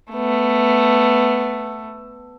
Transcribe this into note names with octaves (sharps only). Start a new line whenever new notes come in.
A3 B3